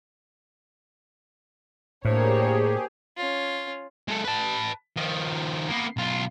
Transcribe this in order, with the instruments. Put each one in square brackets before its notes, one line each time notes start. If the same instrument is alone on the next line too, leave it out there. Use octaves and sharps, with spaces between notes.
[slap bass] A2 [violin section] A#3 D4 C#5 [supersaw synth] G4 G#4 [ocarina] C5
[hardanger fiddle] C#4 F4
[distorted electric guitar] G#3 A4
B4 A5
D#3 F3
A#3 B3
B1 F4